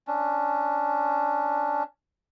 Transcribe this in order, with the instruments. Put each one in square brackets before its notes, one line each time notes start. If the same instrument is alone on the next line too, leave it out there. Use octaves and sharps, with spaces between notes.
[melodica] C#4 D4